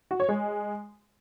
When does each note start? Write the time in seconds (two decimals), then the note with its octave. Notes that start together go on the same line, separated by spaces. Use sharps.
0.11 F#4
0.20 C#5
0.29 G#3